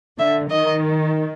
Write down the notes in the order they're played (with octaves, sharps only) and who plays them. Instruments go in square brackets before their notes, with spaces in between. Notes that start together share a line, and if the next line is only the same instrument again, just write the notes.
[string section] D3 [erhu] E5
[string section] D#3 [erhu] D#5